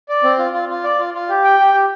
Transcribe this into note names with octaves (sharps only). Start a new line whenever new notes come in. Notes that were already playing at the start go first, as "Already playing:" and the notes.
D5
C4
F4
F4
F4
D5
F4
F4
G4
G5
G4
G4